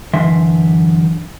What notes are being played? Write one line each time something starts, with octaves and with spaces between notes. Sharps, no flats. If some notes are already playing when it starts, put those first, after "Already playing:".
F#2 D3 E3 E5 C6